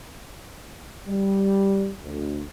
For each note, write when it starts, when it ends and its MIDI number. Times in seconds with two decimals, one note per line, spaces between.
1.07 1.90 55
2.01 2.43 38